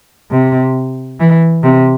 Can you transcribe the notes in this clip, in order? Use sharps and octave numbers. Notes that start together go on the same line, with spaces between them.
C3
E3
C3